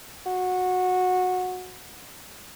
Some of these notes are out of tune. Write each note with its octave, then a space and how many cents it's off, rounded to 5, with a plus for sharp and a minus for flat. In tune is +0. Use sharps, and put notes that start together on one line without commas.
F#4 -15